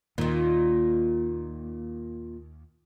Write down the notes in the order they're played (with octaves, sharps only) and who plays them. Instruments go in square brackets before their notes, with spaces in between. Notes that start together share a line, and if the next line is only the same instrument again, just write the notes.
[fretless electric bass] D#2 [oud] A#2 D#3